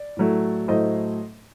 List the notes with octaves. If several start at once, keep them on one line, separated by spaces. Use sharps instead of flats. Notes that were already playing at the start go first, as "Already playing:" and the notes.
Already playing: D5
A2 F#3 A3
A2 F#3 A3 C5 D#5